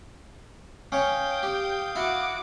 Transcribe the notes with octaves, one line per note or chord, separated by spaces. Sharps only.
C#4 C#5 F5 G5 D#6
G4
E4 F#4 D6